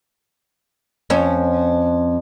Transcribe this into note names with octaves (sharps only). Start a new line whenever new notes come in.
F2 C#4